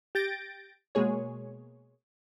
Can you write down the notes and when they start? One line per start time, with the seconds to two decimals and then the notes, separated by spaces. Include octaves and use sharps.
0.15 G4 G6 A6 A#6 D7
0.95 B2 G#3 A#3 G#4 C#5